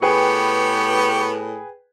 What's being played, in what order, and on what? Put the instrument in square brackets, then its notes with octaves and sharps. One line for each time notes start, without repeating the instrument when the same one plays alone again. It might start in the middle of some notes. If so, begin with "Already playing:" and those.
[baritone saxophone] A2 [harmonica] B3 G4 [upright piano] G#4 B4 G5 [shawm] C#6